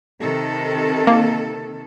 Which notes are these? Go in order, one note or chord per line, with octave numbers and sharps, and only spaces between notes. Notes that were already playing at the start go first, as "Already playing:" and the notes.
C3 D#3 A4
A#3